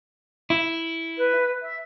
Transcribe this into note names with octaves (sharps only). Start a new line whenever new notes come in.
E4
B4
E5